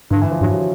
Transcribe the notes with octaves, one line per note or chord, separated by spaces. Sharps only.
G2 D3
E3
F3
G2 F#3
F#3